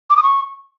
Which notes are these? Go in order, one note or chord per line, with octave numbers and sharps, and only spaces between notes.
D6
D#6
C#6